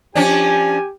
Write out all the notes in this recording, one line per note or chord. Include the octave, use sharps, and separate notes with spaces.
F3 C#4 D4 G4 G#5